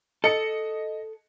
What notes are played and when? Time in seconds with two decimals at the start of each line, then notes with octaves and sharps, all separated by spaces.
0.24 A4 D#5 C#7